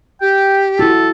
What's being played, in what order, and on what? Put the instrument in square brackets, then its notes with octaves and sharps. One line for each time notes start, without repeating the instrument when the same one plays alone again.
[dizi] G4 [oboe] G5
[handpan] E4 F#4 [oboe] A4